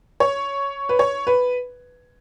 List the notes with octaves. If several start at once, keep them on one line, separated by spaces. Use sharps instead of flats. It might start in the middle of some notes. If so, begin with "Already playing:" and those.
C#5
B4
C#5
B4